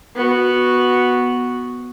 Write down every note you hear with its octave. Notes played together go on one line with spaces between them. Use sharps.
B3 F#4